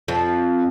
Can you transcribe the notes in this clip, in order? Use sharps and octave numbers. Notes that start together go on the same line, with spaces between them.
F2